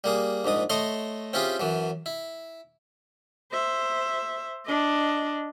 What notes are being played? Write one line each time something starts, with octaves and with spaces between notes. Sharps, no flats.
G3 A#3 G#4
A#1 G#2 G#3 D#6
A3 C#5 D#5 C6 D#6
C4 C#4 E4 F4 G4 G#4
F#2 E3 F#3
E4
C5 E5
D4 D#5